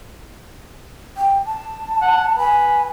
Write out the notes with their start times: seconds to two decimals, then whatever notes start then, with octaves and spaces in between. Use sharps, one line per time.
1.17 G5
1.46 A5
2.02 F#5
2.38 B4 G#5